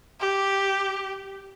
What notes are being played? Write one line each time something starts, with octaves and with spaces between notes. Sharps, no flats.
G4